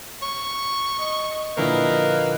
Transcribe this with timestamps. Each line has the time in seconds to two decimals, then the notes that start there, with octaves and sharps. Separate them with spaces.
0.22 C#6
0.98 D#5
1.57 A#2 D3 F3 A#3 E4 B4 D#5